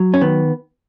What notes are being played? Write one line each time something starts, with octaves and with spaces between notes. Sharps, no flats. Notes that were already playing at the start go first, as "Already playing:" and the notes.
Already playing: F#3
C#4
D#3 B3